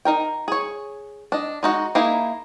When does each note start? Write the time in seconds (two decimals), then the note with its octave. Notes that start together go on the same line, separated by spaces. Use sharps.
0.05 D#4 A#4 G5
0.48 G#4 C#5
1.32 D4 D#5
1.63 G#3 D#4 F#4
1.95 A#3 D#4 E4 G#4